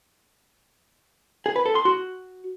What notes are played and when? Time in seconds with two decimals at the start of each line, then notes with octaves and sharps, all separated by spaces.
1.46 G#4
1.56 B4
1.66 A4
1.75 C6
1.85 F#4